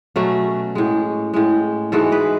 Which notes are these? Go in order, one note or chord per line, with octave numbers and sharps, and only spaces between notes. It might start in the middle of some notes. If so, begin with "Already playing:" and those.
B2 F#3 A3 C#4
A2 G#3
A2 G#3
G#2 E3 G#3 F#4 A4
G#4 B4